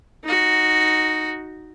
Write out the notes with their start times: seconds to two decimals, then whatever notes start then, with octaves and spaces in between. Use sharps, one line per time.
0.24 D#4 F#4